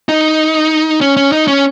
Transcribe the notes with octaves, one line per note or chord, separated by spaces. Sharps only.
D#4
C#4
C#4
D#4
C#4